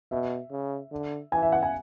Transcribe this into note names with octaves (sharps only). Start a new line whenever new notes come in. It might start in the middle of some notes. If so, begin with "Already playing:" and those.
B2 E5
C#3
D3
E3 G#5
E5
F#5
G#5